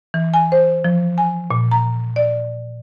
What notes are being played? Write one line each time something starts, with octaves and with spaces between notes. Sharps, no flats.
E3
G#5
C5
F3
G#5
A#2
A#5
D5